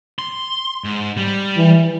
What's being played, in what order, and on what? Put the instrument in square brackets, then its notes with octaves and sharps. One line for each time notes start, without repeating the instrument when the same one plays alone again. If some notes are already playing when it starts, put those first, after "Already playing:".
[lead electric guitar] C6
G#2
G3
[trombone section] E3